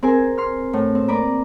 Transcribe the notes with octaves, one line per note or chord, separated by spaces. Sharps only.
C4 G#4 A#4 G#5
C6 F6
A2
C4
A#3 A#4 B4 D5